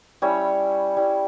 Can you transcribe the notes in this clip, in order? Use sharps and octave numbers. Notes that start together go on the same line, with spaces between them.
G3 C#4 E4 C#5
G3 C#4 E4